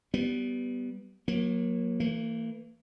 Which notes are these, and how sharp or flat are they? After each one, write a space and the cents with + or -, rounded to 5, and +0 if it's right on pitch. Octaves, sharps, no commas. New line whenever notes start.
G3 -15 B3 +0
F#3 -25 A#3 +15
E3 +0 A#3 -45